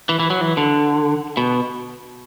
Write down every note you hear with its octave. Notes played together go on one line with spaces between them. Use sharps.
E3
E3
F#3
E3
D3
B2